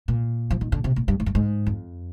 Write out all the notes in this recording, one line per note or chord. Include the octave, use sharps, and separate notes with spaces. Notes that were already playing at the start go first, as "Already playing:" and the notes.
A#2
F3
D#3
D3
C3
A#2
G2
G#2
G2
G#2
F2